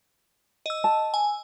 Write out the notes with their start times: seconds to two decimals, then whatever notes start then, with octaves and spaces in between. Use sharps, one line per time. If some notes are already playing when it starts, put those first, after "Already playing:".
0.66 D#5 E6
0.84 A5
1.14 G#5